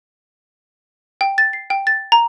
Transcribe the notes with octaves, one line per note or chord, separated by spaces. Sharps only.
G5
A6
C7
G5
A6
A#5